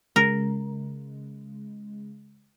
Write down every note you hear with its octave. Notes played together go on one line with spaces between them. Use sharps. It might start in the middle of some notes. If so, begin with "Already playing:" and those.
C#3 G#3 A#4